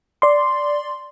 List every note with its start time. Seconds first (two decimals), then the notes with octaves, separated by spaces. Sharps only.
0.22 D5 C6